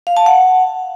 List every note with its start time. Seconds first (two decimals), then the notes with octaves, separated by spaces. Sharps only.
0.07 F5
0.17 A5
0.26 F#5